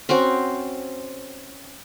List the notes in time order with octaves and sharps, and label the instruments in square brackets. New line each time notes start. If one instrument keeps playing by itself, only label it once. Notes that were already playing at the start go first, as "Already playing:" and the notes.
[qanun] C4 C#4 F#4 C5